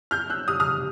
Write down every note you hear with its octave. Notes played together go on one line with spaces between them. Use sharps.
F6 G6
E6 F#6
D#6 F6
D#6 F6